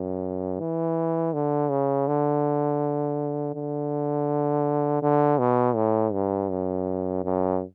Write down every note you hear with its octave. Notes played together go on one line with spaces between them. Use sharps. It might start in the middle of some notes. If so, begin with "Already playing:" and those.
Already playing: F#2
E3
D3
C#3
D3
D3
D3
B2
A2
G2
F#2
F#2